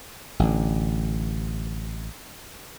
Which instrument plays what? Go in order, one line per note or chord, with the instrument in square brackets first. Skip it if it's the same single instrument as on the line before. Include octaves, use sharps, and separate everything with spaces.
[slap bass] A1 D3